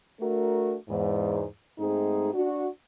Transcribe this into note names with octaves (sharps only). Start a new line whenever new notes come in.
A3 D4 F#4 A#4
E2 G#2
G#2 A3 C4 D#4 G#4
D4 F#4